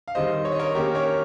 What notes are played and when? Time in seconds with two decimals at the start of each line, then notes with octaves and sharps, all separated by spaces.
0.08 F5
0.15 D#3 G3 C4 C5 D#5
0.45 C#5
0.52 D#5
0.59 A#4 C#5
0.75 D#3 A#3 C#4 G4 A#4
0.95 A#4 C#5